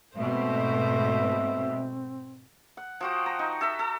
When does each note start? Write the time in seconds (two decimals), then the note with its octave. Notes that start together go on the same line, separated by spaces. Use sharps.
0.17 G#2 B2 A3 C4 C5 E5
2.77 F#5
3.01 F3 F#4 G5
3.26 A#5
3.39 D#4
3.61 A4 E5 A#5
3.79 A4